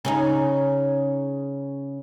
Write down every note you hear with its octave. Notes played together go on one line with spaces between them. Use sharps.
C#3 C#4 D#4